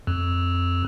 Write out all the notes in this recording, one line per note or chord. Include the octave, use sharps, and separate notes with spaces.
F2